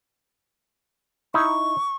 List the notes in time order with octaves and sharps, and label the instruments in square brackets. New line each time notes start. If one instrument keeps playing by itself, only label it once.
[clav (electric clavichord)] D#4 E4 [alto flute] C#6